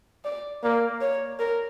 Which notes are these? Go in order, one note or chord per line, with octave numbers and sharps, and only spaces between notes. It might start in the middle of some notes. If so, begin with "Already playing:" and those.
D5
A#3 D5
C#5
A#4